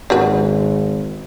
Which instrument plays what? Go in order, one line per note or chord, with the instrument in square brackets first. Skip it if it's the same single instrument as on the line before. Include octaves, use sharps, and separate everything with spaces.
[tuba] G#1 [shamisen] C#4 F#4 B4